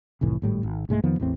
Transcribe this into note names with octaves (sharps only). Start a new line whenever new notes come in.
F1 C2 A2 E3
G#1 A2 G3
G#1
C2 G#2 G#3 A3
F2 D#3 F3 B3
A1 E2 E3 C4